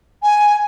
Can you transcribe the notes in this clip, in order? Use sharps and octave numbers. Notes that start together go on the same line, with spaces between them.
G#5